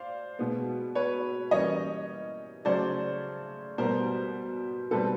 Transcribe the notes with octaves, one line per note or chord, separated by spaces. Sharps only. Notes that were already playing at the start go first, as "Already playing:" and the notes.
Already playing: C5 D5 F5
B2 G#3 B3
B4 C#5
E3 G3 A#3 C#4 C#5 D#5
C#3 F#3 A3 C#4 C5 D5
B2 G3 B3 A#4 C5
B2 G3 C4 A4 B4